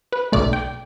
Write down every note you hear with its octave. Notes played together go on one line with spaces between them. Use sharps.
B4
B1 B2 A3 D5
G5